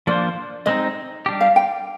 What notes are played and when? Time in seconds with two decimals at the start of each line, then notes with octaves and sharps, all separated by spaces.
0.07 F3 A#3 D4 F4 C5 D5
0.66 G#3 C4 D#4 D#5
1.26 G3 D4 G4
1.41 F5
1.56 G5